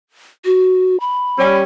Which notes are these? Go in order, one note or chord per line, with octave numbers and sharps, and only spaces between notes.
F#4
B5
G3 C#4